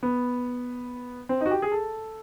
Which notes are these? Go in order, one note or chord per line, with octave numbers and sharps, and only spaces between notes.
B3
C4
D#4
F#4
G4
G#4
A4